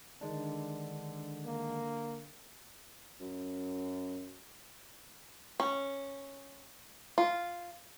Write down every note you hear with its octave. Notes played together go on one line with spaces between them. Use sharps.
D3 D#3 G#3 D4
A#3
F#2
C#4
F4